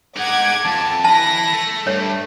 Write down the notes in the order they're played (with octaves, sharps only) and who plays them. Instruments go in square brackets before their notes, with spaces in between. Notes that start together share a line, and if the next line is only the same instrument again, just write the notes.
[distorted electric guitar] D#4 G#4 [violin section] F#5 D6 G#6
[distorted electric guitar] F2 [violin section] A5
[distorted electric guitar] E4 B4 [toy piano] A5 [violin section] A#6
[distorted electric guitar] A3
[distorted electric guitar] G2 [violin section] A3 [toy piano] C#5